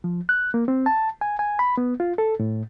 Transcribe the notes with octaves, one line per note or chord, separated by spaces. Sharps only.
F3
F#6
A#3
C4
A5
G#5
G#5
B5
B3
F4
A4
A2